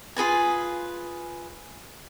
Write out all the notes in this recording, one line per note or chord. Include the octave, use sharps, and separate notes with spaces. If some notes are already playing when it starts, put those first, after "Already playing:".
F4 G#4 B4 G#5